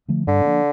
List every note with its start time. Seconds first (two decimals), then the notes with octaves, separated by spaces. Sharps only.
0.08 D3 F3 A3
0.27 G2 D3
0.45 F3 A#3 D4